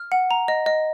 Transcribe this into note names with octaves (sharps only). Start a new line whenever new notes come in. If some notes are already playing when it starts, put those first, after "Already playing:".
Already playing: F6
F#5
A#5
D#5
D#5